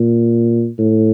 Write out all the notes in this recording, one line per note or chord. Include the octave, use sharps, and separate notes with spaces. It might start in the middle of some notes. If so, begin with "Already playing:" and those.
Already playing: A#2
A2